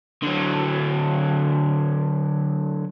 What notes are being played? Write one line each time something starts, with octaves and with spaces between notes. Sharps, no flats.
D3 F#3